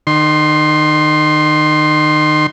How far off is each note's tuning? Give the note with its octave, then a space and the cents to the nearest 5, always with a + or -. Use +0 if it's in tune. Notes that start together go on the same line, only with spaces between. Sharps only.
D#3 -35 C6 +10